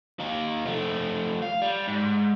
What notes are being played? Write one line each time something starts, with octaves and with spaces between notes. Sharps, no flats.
A#3 D#4
F3 A3
F5
G3
G#2